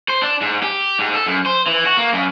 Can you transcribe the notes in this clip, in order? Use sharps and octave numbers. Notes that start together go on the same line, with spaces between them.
C5
D4
G#2
G4
G#2
A4
F#2
C5
E3
F#4
A#3
F#2